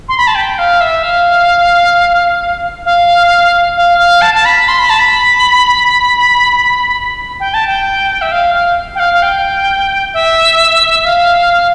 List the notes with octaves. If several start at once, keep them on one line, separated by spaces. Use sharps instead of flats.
C6
B5
A5
G5
F5
E5
F5
F5
F5
F5
A5
A5
B5
C6
B5
A5
B5
G5
A5
G5
E5
F5
F5
G5
F5
F5
G5
E5
F5